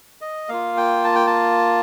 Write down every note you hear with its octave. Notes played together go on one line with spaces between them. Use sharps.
D#5
A#3 F4 F5
G5
A5
G5
A5